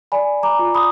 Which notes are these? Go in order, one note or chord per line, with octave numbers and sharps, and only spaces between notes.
D5 G#5 B5
A#5 D6
F4
B5 D#6